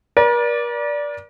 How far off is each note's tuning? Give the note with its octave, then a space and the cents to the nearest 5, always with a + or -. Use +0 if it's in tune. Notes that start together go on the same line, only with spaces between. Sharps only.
A#4 +45 D5 -10